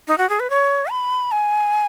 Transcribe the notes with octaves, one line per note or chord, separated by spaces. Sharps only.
D#4
F#4
G#4
B4
C#5
B5
G#5